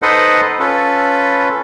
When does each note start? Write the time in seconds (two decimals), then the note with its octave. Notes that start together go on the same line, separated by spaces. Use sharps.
0.02 D#4 A4 B4 C5 D#5 F#5
0.60 C#4 F4 A4 B4